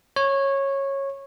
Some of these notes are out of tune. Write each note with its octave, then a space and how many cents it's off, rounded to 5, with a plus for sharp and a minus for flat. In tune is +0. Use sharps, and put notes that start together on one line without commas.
C#5 -15